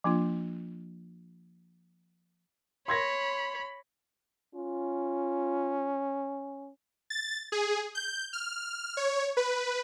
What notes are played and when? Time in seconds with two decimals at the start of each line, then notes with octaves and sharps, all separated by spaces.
0.04 F3 A#3 D4 F4
2.88 C#5 B5 C6 G#6 A#6
4.55 C#4 F4
7.10 A6
7.52 G#4
7.95 G6
8.33 F6
8.97 C#5
9.37 B4